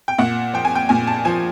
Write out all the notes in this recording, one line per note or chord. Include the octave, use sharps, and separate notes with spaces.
G5
A#2 F#5
F3 G5
G#5
G5
A#2 G#5
A5
F3 G#5